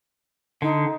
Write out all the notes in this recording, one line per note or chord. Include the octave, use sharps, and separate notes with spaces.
D3 D#4